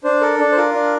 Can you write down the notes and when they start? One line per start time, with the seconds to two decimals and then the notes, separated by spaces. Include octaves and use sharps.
0.04 D4 C5
0.21 A4 A#4
0.39 D4
0.52 C5
0.57 F4 A#4
0.74 D4